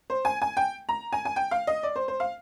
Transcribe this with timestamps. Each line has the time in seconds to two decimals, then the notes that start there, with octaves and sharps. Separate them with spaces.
0.10 C5
0.25 G#5
0.42 G#5
0.57 G5
0.89 A#5
1.13 G#5
1.25 G#5
1.36 G5
1.51 F5
1.67 D#5
1.83 D5
1.96 C5
2.08 C5
2.20 F5